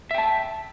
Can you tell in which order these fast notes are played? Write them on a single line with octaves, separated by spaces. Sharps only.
E5 G5 A5